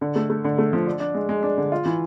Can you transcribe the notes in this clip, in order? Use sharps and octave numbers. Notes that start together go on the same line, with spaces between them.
D3
A3
A3
D3
A3
F3
D4
D4
G#3
G#3
D4
D3
F4
E3